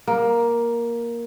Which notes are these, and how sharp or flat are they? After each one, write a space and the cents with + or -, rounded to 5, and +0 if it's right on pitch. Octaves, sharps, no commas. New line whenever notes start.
A#3 +10